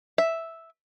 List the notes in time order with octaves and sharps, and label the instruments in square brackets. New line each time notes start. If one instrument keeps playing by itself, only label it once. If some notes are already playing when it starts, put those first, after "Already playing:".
[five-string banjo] E5